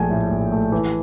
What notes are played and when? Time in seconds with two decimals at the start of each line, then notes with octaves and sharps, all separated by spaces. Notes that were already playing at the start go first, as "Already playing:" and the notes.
Already playing: A#1 F3 A3 G5 G#5
0.10 A2
0.31 A#1
0.52 A3
0.72 E3